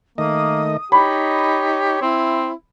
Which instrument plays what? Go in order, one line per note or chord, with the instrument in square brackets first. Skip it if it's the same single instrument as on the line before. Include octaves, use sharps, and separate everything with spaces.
[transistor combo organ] D#3 A3 D#5 [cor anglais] A#3 [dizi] D#6
[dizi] D#4 [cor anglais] G4 [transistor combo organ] C#5 [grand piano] B5
[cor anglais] C4 [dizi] E4